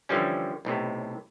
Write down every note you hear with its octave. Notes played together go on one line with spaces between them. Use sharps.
D3 E3 F3 G3 C#4
B1 A2 C3